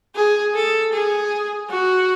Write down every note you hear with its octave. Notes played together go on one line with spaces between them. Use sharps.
G#4
A4
G#4
F#4